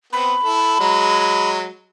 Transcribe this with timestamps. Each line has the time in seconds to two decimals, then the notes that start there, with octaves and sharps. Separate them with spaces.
0.13 B3 C4 B5
0.44 E4 A4
0.80 F#3 G#3